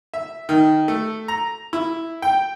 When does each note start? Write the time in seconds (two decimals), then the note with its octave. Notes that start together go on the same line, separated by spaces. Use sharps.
0.14 E5
0.49 D#3
0.88 A3
1.28 A#5
1.73 E4
2.22 G5